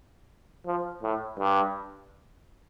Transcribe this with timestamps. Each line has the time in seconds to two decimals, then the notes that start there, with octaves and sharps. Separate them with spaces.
0.66 F3
1.03 A2
1.38 G2